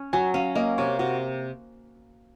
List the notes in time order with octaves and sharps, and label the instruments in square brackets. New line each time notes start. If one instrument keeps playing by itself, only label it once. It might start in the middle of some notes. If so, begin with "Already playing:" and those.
Already playing: [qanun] C#4
[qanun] F#3 [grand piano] G#5
[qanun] C#4 [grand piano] F5
[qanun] A#3 [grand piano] D#5
[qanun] C3 [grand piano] C#5
[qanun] C3 [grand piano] F#4